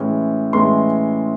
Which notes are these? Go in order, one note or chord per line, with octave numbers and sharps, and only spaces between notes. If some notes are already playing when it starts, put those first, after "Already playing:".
Already playing: A2 E3 G#3 C#4
A2 E3 G#3 C#4 C6